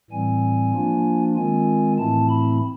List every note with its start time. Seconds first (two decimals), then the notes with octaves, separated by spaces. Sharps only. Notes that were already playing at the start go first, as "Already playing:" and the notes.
0.11 A2 E3 G3 C4 G#5
0.74 F3 A#3 D4 F4
1.36 D#3 G#3 C4 F4 G#5
1.98 A2 E3 A3 C4 E4 A5
2.30 B5